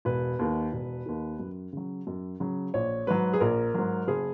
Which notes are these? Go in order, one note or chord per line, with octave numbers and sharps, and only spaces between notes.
E1 B4
D#2 D#3
E1
D#2 D#3
F#2
C#3 F#3
F#2
C#3 F#3
A#1 C#5
G#2 F#3 B4
G#4
A#1 A#4
G#2 F#3
F#1 G#4